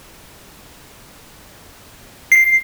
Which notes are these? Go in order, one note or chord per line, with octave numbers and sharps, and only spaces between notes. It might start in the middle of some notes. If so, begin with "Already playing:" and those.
C7